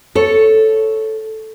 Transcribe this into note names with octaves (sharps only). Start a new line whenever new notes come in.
A4 C#5